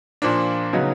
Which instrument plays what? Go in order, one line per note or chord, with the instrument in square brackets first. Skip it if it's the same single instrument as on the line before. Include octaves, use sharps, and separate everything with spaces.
[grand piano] A#2 F3 A#3 D4
C#3 F#3 B3 D#4